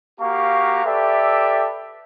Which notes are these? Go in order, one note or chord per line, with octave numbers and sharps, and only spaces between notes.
A#3 F#4 G4 F5 A#5 C#6
G4 A4 B4 D5 E5